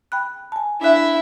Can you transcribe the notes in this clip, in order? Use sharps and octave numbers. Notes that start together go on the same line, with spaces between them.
G5 B5 F#6
G#5 A5
D4 E4 E5 F#6